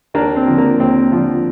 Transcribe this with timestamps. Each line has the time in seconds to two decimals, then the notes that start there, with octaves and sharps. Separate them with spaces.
0.14 D#2 A#3 D4
0.36 C4
0.47 D3 F3
0.58 A#3
0.80 D#2 C4
1.12 D3 F3